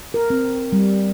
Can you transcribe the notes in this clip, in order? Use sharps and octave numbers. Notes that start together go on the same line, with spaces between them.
A#4
C4
G3